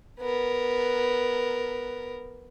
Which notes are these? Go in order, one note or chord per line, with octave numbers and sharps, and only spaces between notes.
B3 A#4